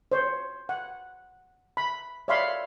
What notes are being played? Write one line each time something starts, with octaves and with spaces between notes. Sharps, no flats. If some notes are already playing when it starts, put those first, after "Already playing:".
C5 C#5
F#5
B5
C#5 D5 E5 F5 B5 C6